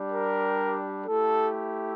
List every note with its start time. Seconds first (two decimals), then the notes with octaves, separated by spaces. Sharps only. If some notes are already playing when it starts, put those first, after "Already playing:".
Already playing: G3 D4 G4
0.10 A#4
1.06 A3 E4 G4 A4